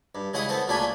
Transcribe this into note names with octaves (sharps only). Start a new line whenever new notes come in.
G2
C#3 G#3 E4 F#5 D#6
B3 C4 A4
C#2 A#2 A3 D4 G#5 B5